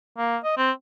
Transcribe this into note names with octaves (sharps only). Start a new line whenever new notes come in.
A#3
D#5
C4